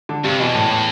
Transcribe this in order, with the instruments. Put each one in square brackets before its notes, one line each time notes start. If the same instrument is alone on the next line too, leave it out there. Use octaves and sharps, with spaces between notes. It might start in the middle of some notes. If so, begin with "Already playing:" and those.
[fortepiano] D3
[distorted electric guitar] G2 [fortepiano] C3
[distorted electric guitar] E2 [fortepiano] B2
[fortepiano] A2
A2